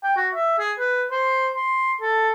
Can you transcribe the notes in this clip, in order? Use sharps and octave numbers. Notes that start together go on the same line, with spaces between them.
G5
F#4
E5
G#4
B4
C5
C6
A4